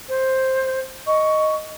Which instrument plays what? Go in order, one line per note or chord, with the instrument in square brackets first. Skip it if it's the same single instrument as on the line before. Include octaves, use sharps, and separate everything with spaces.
[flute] C5
[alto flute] D#5 [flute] C#6